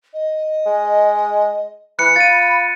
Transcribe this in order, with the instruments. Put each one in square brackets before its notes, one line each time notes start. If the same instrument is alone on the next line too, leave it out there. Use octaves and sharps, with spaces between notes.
[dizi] D#5
[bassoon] G#3
[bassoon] E3 [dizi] B5 [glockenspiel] F#6 C#7
[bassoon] F4 [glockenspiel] A6 D#7